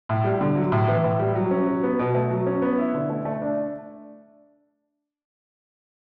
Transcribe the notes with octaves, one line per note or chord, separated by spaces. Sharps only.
A2
G3
D3
F#3
A2
E3
A2
G3
F#3
C#4
F#3
B3
B2
A3
F#3
C#4
B3
E4
D3
A3
A3
D4